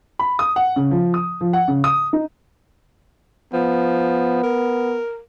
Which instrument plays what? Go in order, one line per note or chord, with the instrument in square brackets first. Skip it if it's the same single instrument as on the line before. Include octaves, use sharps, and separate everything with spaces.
[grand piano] B5
D#6
F#5
C#3
F3
D#6
F3
F#5
C#3
D#6
D#4
[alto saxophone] F3 [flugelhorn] B3
[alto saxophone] A#4